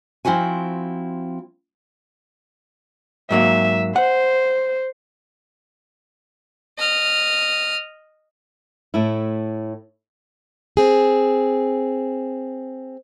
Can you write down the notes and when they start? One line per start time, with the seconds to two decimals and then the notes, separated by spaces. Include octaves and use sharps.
0.25 F3 C4 E4 F#4 G#5
3.31 G#2 F#3 A#3 E5
3.96 C5 F#5
6.79 D#5 F6
8.94 A2 A3 E4
10.77 C4 G#4